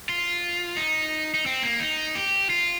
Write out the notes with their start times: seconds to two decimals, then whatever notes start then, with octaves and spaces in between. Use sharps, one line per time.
0.09 F4
0.77 D#4
1.34 D#4
1.46 C4
1.63 A#3
1.80 D#4
2.15 G4
2.50 F4